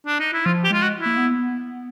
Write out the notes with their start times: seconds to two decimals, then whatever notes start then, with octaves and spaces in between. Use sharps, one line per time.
0.07 D4
0.20 D#4
0.33 E4
0.46 F3 F4
0.64 G4
0.70 G#3 F4
0.82 F#4
1.00 E4
1.06 A#3
1.18 B3